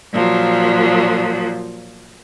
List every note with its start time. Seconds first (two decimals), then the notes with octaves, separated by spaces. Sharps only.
0.12 A#2 F3 F#3